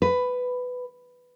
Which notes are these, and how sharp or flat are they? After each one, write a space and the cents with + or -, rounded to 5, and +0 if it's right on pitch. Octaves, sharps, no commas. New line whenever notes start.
B4 +10